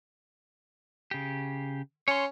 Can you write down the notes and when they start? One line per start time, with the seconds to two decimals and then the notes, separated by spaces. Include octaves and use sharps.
1.11 C#3 G4
2.08 C#4 C#5 C6